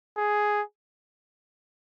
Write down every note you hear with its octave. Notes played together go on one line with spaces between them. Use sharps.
G#4